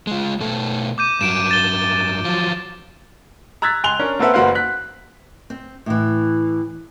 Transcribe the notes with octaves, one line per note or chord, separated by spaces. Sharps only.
G#3 F4
B2 A3 A4
D6 G6 D#7
G2 F#3 D7 E7
A6 G7
F3 F#3
A#5 E6 F#6 G#6 A6 B6
C#2 G#5 C6 F#6 F7 G7
C#4 D4 A#4
A#3 C4 A4 B4 E5 F#5
F#1 A#3 F#4 B4 C5 F5
F#6 B6
C4
A2 E3